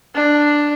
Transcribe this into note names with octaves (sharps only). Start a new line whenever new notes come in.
D4